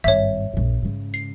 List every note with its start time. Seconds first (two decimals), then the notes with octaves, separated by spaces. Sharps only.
0.04 G#1 G2 C#5 E5
0.53 A#1 F#2
0.82 G#2 C#3
1.14 C7